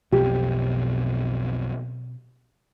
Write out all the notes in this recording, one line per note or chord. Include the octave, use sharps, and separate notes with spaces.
B1 F2 B2 C4 G4